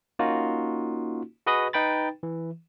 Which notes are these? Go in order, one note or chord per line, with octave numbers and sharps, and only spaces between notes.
A#3 C#4 D#4 F4 F#4
F#4 G#4 B4 D#5 B5 D#6
D#4 B4 G5 B5 A6
E3